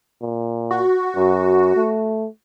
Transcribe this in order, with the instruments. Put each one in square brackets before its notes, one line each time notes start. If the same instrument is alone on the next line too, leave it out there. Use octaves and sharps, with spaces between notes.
[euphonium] A#2
[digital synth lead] F#4
[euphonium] F#2
A3